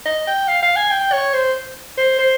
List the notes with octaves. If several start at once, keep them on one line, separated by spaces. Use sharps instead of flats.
D#5
G5
F5
F5
G#5
G5
C#5
C5
C5
C5